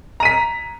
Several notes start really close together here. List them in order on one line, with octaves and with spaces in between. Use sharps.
A#5 D#7 B6